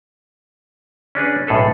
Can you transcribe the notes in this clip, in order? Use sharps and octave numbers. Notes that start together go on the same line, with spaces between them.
C#4 D4 G#4 B4
B1 A2 G#4 A4 B4